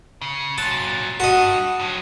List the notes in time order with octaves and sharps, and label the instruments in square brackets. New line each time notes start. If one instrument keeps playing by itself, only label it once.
[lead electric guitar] C#3
[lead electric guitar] A#2 F#3 [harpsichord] A5
[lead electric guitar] G2 [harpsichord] F#4 D#5
[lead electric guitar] G2 F#3